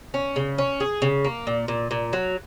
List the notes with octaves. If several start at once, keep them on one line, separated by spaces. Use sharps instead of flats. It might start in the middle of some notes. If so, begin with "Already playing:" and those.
C#4
C#3
C#4
G#4
C#3
A#3
A#2
A#2
A#2
F#3